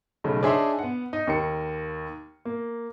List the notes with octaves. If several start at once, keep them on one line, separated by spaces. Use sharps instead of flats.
B1 C#3 A3 B5
D4 D#4 G#4 C#5 E5 C6
B3 F#5
D#4
D#2 A#4 C#7
A#3